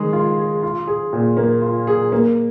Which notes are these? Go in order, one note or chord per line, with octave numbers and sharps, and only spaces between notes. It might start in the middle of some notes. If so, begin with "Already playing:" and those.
Already playing: D#3 G#3 G#4
F4
G#4
F4
G#4
A#2
A#3
F4
G#4
A#3